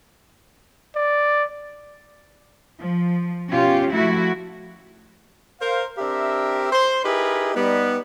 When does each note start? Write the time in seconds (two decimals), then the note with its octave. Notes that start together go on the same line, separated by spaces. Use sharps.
0.96 D5
2.78 F3
3.48 B2 C#4 F4 G4
3.91 F3 A3 E4 F#4
5.61 A#4 C5 F5
5.98 C4 D4 G4 A#4 E5
6.72 C5 C6
7.05 D#4 E4 G4 G#4 A#4 B4
7.55 G3 B3 D#4